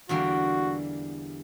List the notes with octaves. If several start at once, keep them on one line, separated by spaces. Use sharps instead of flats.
E2 D3 G3 A#3 F#4